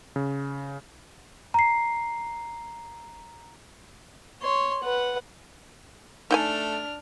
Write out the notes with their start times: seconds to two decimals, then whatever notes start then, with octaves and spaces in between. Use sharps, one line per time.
0.16 C#3
1.54 A#5 C7
4.42 C#5 C6
4.83 B4 F#5
6.31 A3 D4 D#4 G5 G#5 F6